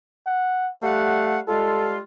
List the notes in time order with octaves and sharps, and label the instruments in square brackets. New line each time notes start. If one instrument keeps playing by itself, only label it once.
[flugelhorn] F#5
[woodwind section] G3 F5 F#5 [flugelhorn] A3
[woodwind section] G3 G#3 F4 [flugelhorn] A4